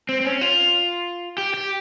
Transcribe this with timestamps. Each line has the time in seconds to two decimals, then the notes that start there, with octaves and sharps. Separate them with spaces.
0.09 C4
0.21 C4
0.25 C#4
0.41 F4
1.38 G4
1.54 G4